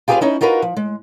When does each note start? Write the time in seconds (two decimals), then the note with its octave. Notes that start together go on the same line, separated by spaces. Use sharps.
0.08 F4 G4 G#4 A#4 B4 F5
0.21 C#4 D#4 E4
0.41 D#4 F4 F#4 A#4 B4
0.62 F3
0.77 G#3